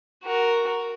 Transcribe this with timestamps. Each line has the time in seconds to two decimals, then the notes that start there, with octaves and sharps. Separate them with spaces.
0.24 F#4 A#4